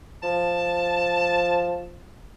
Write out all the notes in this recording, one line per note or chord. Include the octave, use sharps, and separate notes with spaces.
F3 A5